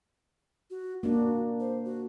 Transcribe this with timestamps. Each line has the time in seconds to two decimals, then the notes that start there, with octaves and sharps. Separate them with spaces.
0.70 F#4
1.03 A#3 D4 F#4
1.60 C5
1.85 F#4